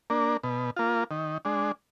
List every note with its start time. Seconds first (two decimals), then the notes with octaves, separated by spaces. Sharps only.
0.10 A#3 D4
0.43 B2
0.76 A#3 F4
1.11 D#3
1.45 G#3 D4